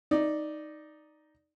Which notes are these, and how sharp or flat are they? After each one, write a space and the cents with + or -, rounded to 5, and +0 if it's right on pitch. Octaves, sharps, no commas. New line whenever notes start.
D#4 +0 D5 +5